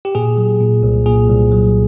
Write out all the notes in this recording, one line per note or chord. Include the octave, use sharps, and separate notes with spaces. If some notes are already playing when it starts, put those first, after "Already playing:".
G4
A#2 G#4
F#3
A#2
C2
A#2 G#4
C2
F#3